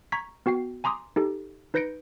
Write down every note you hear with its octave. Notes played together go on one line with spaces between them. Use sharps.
A#5 C#6 G#6 B6
B3 F#4 G5 C7
G#5 A#5 C6 D6 D#6
D#4 G4 A4
D#4 B4 G6 A#6 C#7 D7